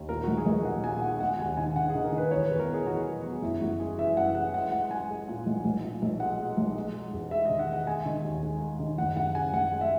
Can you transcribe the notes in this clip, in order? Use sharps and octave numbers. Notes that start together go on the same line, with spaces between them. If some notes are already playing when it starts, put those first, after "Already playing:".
Already playing: D#2
A#2 A#4
B1 F#4
G#4
B1 A#4
A#2 F#5
A#2 G#5
G#3 F#5
G#3 F#5
D#2 G#5
D#3 G#5
D#3 F#5
G#4
D#3
A#4
D#3
B4
E2 C#5
E2 B4
A#4
B2 G#4
E2 F#4
F#3
F#3
F#1 E4
F#1 F#4
G#3 G#4
E3 E5
F#2 F#5
E3 F#5
G#3 F#5
G#3 F#5
G#3 G#5
G#3
A#2
B1
B1
A#2
B1
G#3 F#5
G#3
B1
G#3
G#3
E1
G#3 E5
D#3 D#5
F#5
G#3
F#5
G#3 G#5
D#3
D#2
G#3
G#3
D#3
F#1 F#5
F#1 F#5
C#3 G#5
F#1 F#5
G#3
E5